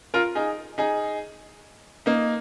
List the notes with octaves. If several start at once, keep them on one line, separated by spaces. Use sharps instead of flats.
F4 A#4
D#4 G#4
D#4 G#4
A#3 D#4